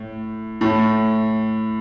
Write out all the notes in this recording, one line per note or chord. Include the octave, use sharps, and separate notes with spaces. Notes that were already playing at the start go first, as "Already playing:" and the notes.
Already playing: A2
A2